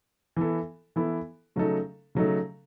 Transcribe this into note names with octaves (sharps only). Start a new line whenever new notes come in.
E3 B3 E4 A4
E3 B3 E4 A4
C#3 F#3 A3 D#4 A4
C#3 F#3 A3 D#4 A4